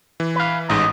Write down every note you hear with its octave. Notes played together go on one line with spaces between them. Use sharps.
E3
B4 F5
A1 G#2 D#5